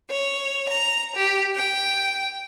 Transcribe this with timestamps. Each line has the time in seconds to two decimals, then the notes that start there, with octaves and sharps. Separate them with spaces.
0.10 C#5
0.69 A#5
1.15 G4
1.55 G5